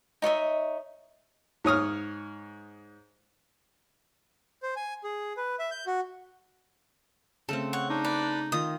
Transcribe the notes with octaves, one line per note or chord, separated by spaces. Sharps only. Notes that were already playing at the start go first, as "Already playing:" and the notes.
D#4 C#5 D#5 E5
G#2 C#5 D#6 F6
C5
G#5
G#4
B4
E5
G6
F#4
C#3 A3 C4 A4
C#5 F#5
D4 D#4
B4 D5
D#3 F4 D#5 D#6